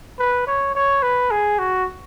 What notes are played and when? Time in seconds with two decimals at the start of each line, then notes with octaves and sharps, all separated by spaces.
0.19 B4
0.47 C#5
0.75 C#5
1.03 B4
1.31 G#4
1.59 F#4